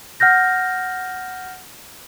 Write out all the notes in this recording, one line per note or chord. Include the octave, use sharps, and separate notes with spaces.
F#5 F6 G6 A#6